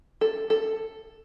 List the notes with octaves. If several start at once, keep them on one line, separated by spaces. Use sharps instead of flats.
A4
A4